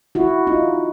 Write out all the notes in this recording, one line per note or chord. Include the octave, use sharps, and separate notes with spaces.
E4 F#4
D#4 F4